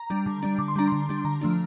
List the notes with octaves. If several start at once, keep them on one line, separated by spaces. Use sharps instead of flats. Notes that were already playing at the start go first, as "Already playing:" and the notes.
Already playing: A#5
G3 D4
D3
G3 D4
D3 D6
C6
G3 D4 A#5
D3 C6
G3 D4
D3 A#5
F3 A3 D4